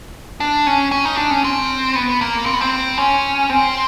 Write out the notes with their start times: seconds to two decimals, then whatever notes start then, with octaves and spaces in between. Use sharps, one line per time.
0.40 D4
0.67 C#4
0.92 C#4
1.05 D#4
1.17 D4
1.31 C#4
1.44 C4
1.95 B3
2.21 A#3
2.46 C4
2.54 B3
2.61 C4
2.98 C#4
3.49 C4